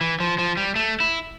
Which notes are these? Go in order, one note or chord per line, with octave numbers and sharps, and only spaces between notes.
E3
F3
F3
G3
A3
E4